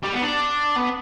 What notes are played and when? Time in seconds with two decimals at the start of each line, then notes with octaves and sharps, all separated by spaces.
0.04 G3
0.14 B3
0.23 D4
0.76 B3